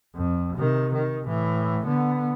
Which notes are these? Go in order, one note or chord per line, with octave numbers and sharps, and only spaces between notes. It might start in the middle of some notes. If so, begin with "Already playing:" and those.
F2
C3 D#3
D#3
A2 E3
D3 B3